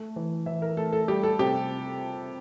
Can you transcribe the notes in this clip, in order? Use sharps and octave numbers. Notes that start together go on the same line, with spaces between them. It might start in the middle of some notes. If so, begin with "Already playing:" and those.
Already playing: A3
E3
E3 E5
A#4
A3 A4
A4
G3 G4
A4
C3 G4